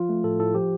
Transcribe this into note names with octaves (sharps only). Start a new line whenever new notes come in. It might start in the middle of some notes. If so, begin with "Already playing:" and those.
Already playing: F3 F4
A3
A2 A4
A2 A4
F3 G4